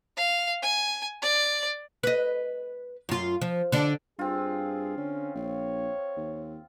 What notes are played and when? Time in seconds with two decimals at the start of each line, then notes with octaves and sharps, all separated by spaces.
0.17 F5
0.62 G#5
1.22 D5
2.03 B4 D#5
3.09 F#2 F4
3.42 F3
3.72 D3 D4
4.19 G2 C4 F4 G#4
4.97 D3 C#4
5.35 A#1 C#5
6.17 D#2